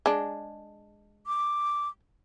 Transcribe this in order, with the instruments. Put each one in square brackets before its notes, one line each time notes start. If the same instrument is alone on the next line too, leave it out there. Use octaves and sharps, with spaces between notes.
[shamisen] G#3 D4
[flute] D6